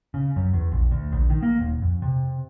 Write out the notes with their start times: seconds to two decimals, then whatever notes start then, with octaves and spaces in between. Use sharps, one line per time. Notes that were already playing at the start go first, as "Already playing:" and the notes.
0.14 C#3
0.36 F#2
0.53 E2
0.71 A#1
0.91 D2
1.12 A#1
1.30 D#3
1.42 A#3
1.59 D#1
1.82 F2
2.02 C3